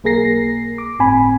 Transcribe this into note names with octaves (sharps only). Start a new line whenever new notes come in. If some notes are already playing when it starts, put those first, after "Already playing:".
B1 A#3 G#4 A#4 A#6 C7
D6
G1 A2 C4 G#5 B5